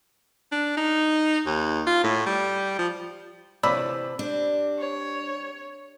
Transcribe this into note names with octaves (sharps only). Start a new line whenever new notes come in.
D4
D#4
D#2
F4
A2
G3
F3
C3 E3 A3 E4 D5 B5 E6
G3 C4 D4
C#5